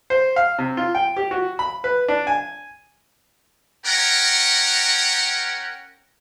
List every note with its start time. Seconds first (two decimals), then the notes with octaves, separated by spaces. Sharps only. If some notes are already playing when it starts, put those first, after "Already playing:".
0.10 C5
0.36 F5
0.59 C3
0.77 F4
0.95 G5
1.17 G4
1.31 F#4
1.59 B5
1.84 B4
2.08 D4
2.27 G#5
3.86 C#4 A#4 F#5 G5 A#5